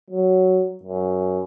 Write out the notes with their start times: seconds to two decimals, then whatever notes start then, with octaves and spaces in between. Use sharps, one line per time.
0.10 F#3
0.83 F#2